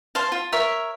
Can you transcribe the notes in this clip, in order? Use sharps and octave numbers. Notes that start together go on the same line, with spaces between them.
C5 F5 A5
F4
A#4 C#5 E5